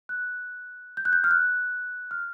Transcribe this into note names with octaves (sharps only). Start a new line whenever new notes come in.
F#6
G6
F#6
G6
F6
F#6
F6